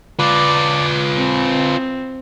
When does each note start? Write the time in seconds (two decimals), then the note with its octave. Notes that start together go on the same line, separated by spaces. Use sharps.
0.19 F4 B4 D5
1.17 C4